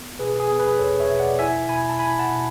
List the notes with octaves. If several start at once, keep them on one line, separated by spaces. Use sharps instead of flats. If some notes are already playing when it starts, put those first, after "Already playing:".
Already playing: B3
B2 G#4 B4
G#4
B3
G#4 B4
E2 A4 C#5
C#5 E5
B2
D5 F#5
E4 E5 G#5
B2 G#5 B5
A5
E4 G#5 B5
F#5 A5
B2